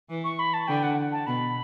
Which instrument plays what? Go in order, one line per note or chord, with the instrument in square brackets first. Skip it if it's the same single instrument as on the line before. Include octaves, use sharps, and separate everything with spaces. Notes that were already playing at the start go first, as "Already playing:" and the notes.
[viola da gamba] E3
[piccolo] C#6
B5
A5
[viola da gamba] D3 [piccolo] G5
[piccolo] F#5
A5
[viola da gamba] B2 [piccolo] B5